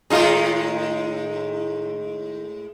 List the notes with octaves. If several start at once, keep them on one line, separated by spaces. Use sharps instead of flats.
A2 D#3 G#3 D#4 F4 G#4